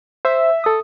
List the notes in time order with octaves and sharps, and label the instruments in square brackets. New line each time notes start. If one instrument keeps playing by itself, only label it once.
[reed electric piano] C5 [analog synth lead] E5
[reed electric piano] A4 D#6